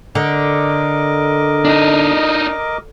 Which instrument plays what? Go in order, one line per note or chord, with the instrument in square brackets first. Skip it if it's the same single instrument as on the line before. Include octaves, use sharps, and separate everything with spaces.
[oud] D3 [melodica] A#4 D#5 D6
[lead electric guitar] D4 D#4